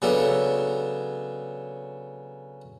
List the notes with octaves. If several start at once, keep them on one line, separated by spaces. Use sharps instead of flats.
C#3 F#3 B3 D4 A4